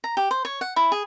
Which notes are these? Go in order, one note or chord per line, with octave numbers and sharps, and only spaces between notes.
A#5
G4
C5
C#5
F#5
E4
G#4